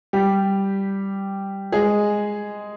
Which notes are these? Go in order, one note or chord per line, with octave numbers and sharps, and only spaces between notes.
G3 G4
G#3 G#4